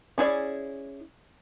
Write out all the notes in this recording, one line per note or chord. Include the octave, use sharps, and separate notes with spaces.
C#4 E4 G#4 D5